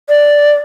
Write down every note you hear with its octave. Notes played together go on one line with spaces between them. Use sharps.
D5